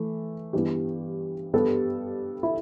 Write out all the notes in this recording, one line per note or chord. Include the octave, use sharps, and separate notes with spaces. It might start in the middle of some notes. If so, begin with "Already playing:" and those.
Already playing: E3 A3
G2 E3 G3 B3 G4
G2 G3 B3 A4
E4